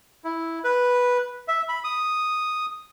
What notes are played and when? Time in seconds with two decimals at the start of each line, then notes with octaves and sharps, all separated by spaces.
0.24 E4
0.64 B4
1.48 E5
1.69 B5
1.84 D#6